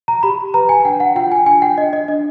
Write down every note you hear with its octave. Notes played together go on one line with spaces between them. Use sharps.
A#5
G4 B5
B4 A#5
G#5
D4 G5
F#5
F4 G5
G#5
D4 G#5
G5
D4 D#5
D#5
D4 D#5